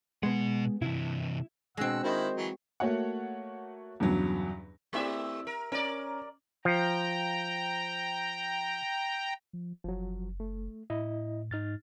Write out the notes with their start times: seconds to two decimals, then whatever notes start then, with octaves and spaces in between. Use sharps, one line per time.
0.23 B2 G#3 B3 F#5
0.82 C3 E3 E4
1.77 B2 G#3 C4 D4 F#5 E6 A#6
2.03 D#3 E4 F#4 A#4 C5 D#5
2.37 E3 F#3 F#4 G#4
2.80 A3 A#3 F#4 C#5 F#5
4.00 E2 G2 C#3 F#3
4.93 A3 C4 E4 G4 D5 E5
5.47 A#4
5.72 C#4 A#4 D5
6.65 F3 G5 A#5
9.53 F3
9.84 F#1 F3 F#3
10.40 A3
10.90 A2 E4 D#5
11.51 G#2 D#4 F6 A6